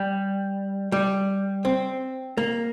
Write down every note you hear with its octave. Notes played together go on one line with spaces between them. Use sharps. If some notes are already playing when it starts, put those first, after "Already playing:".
Already playing: G3
G3
C4
A#3